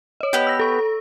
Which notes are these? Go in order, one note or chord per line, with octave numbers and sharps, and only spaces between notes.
C#5 D#5
B3 G4
E6 A#6
A4 C#6